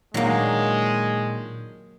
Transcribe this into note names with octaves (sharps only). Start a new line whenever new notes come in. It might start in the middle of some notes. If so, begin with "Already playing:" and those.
A#2 D#3 F#3 G#3 A#3 D4